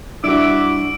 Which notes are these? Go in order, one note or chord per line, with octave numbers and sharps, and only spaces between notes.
G3 D4 E4 F#4 E5 D6 E6 D7